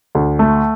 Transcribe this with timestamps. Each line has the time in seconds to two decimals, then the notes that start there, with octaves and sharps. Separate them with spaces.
0.15 D2
0.39 A3